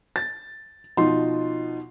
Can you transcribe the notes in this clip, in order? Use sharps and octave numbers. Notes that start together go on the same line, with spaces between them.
A6
B2 F3 D#4 C6